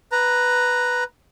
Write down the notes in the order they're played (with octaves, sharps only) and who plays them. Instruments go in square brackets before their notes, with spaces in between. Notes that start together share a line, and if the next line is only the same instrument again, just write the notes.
[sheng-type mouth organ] B4 A#5